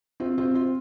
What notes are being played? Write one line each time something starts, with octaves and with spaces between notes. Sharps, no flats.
C4 F4
C4 F4
C4 F4